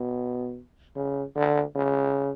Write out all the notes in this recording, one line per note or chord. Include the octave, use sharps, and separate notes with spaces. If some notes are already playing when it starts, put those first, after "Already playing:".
Already playing: B2
C#3
D3
C#3